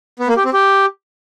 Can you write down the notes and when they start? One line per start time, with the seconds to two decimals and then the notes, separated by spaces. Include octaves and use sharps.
0.20 B3
0.28 A#3
0.36 G4
0.45 C4
0.53 G4